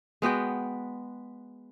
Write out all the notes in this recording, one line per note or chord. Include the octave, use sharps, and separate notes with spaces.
G#3 B3 F#4 G5